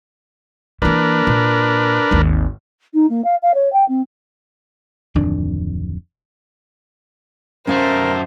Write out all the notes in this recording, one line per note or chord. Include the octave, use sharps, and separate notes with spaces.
E3 A#3 D4 A#4 B4
A#2
G#1 D#2
D#4
A#3
F5
F5
C#5
G5
C4
D1 F2 D#3 D4
F#2 A3 C#4 A#4 C5 F5